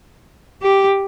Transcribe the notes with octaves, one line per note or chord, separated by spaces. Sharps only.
G4